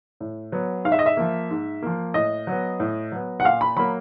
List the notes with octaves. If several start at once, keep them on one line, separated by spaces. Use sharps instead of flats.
A2
F#3 B3
G#2 F5
E5
D#5
E5
F3 A#3
G#2
F3 A#3
A2 D#5
F#3 B3
A2
F#3 B3
F#5
A#2 F5
B5
F#3 A#3 B5